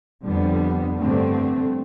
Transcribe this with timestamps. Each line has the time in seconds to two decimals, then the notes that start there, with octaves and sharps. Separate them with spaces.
0.24 F2 D3 G3 B3
0.98 G2 D3 A3 C4